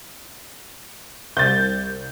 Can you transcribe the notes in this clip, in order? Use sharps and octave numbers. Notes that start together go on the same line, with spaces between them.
C2 G6 A6